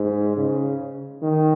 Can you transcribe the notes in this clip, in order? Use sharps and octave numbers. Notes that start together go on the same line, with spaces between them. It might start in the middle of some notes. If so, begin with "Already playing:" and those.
Already playing: G#2
C#3
D#3